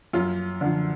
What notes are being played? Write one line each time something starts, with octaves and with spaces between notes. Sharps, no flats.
F#2 F4
D3 F3